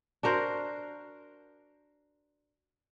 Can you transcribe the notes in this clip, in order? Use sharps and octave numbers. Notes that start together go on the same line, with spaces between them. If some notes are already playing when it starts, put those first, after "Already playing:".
D4 F#4 A#4 C5